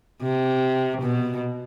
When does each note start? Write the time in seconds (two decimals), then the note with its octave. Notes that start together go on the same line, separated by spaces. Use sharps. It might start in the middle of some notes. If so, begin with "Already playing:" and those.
0.22 C3
1.02 B2